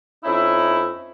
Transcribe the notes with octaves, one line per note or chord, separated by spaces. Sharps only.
F2 C#4 D#4 E4